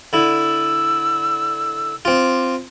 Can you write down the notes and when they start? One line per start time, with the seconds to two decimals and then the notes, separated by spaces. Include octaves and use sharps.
0.13 D3 E4 E6
2.05 C4 F4 D6